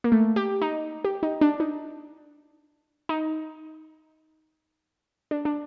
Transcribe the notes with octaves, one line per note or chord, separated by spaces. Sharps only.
A#3
A3
G4
D#4
G4
D#4
D4
D#4
D#4
D4
D4